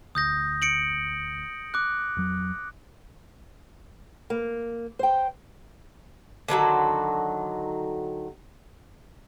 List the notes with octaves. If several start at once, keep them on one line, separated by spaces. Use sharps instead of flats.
D2 D#6 G6 A#6
C#7 D7 F#7
D6 F#6
F2 F#3
A#3
C5 G5
D3 D#3 F#3 A4